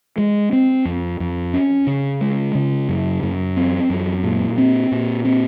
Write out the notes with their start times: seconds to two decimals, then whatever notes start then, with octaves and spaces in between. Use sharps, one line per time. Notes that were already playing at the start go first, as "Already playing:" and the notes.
0.18 G#3
0.53 C4
0.85 F2
1.20 F2
1.54 C#4
1.87 C#3
2.21 G#3
2.55 C#3
2.89 F#2
3.23 F#2
3.57 C4
3.90 F#2
4.24 A#2
4.58 C4
4.92 A#2
5.25 C4